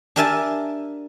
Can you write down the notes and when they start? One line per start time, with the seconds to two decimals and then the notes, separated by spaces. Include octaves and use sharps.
0.16 D4 G4 A#4 E5 G#5 A5